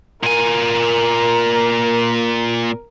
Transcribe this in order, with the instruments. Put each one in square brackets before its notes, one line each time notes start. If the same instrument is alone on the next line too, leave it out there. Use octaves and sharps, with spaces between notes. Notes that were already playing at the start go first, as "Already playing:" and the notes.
[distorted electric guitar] A#2 G#5 [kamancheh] A#4